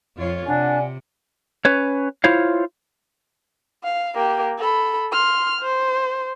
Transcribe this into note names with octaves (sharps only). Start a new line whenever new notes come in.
F2 F4 C#5
C3 D4 D5 F#5 G#5
C#4 B4 C#5
E4 F4 C5 C#5 F5
F5
A#3 G4
A4 B5
C6 F6
C5